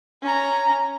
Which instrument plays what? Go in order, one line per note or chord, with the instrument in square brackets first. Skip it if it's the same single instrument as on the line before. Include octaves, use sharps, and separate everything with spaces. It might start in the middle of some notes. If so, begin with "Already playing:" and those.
[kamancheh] C#4 A#5